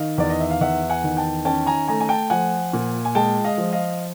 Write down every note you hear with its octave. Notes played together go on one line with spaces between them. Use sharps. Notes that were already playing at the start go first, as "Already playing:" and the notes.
Already playing: D#3 D#5 F5
E2 D5
D#5
E5
F5
E2 E5 F#5
F#5 G#5
D#3
G5 A5
C#4 G5 A5
G#5 A#5
A3 G#5 A#5
G#5
G5 A5
F3 F#5 G#5
A#2
G#5
G#3 G5 A5
D#5 F5
F3
D#5 F5